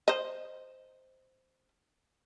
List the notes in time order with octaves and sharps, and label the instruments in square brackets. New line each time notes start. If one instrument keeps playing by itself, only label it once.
[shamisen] C5 D#5